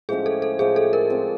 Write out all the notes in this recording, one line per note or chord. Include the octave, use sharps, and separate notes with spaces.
A2 F3 G#3 C#4 G#4
A4
A4
A2 F3 G#3 C#4 G#4
A4
A#4
F3 G#3 C4 F4